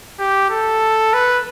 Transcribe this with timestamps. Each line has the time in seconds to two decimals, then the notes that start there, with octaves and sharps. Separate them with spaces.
0.19 G4
0.50 A4
1.14 B4